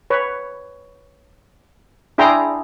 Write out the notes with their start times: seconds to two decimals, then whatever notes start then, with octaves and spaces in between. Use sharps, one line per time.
0.10 B4 C#5
2.18 D4 E4 G#4 G5 A#5 C6